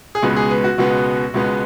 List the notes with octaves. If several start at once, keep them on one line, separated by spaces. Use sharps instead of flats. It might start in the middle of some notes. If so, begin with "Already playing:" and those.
G#4
C#2 B2 G#3 B3 B4
G#4
B4
F#4
C#2 B2 G#3 B3
C#2 B2 G#3 B3